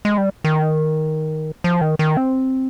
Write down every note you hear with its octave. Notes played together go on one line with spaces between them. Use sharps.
G#3
G3
D#3
F3
D#3
D#3
C4